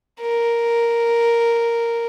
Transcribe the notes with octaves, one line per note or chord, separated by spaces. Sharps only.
A#4